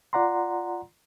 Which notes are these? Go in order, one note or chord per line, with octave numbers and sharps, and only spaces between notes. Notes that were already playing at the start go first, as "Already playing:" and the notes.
F4 D5 F#5 A#5 C6